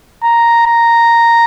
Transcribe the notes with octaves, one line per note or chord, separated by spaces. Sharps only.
A#5
A#5